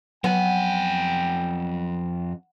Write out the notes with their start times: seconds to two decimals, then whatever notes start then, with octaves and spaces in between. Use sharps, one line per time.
0.24 F2 F#3 B3 G5 G#5